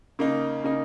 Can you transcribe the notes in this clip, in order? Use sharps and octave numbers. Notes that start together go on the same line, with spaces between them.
C#3 A#3 D#4
C#3 A#3 D#4